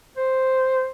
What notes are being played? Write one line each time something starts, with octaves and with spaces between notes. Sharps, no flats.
C5